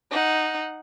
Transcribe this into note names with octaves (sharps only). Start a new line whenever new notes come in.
D#4 F#5